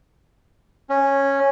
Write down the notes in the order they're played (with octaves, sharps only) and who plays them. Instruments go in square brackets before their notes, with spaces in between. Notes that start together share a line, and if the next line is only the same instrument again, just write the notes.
[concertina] C#4